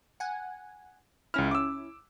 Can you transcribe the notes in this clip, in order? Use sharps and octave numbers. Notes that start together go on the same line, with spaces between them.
F#5 G#5
C#2 C#4 E4 F6
D6 E6